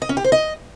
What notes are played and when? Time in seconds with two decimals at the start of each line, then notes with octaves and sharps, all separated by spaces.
0.02 D#5
0.09 C#4
0.17 G4
0.24 C5
0.32 D#5